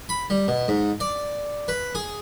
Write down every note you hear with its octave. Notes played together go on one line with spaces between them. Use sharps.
B5
G3
B2
G#2
D5
B4
G#4